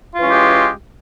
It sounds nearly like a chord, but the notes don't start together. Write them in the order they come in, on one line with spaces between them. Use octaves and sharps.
F4 E3 C#4 G#3 G4